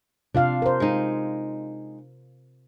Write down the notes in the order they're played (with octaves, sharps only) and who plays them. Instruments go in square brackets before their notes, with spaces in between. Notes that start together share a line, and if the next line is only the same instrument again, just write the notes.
[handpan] C3 F4 F5 [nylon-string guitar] D4
[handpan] A#4 C5
[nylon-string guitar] G#3 D#4